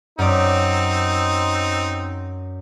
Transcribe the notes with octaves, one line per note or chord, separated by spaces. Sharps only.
F#2 C4 D#4 D5